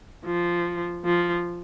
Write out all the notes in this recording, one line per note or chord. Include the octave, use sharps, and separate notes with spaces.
F3
F3